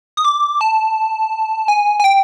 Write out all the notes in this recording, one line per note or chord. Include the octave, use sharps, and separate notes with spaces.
D#6
D6
A5
G#5
G#5
G5